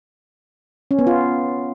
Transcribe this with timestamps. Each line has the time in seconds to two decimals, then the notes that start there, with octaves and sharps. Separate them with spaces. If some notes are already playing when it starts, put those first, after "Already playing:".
0.91 C#4
0.99 B3
1.07 F4